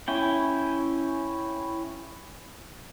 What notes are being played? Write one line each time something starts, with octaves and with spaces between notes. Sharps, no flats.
C#4 E4 G5